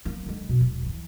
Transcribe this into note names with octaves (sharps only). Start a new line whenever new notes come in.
A#3 B3
D3 G#3
B2
E1
E3 F3